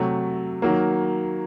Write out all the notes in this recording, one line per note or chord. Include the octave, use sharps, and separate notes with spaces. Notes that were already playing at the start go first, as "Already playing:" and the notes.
Already playing: C3 F#3 A3
D#3 F#3 A#3